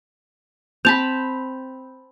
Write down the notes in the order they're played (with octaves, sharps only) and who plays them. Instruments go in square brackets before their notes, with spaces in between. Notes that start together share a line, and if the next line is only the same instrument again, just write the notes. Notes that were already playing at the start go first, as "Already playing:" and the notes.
[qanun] C4 A5 B5 [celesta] G6 F7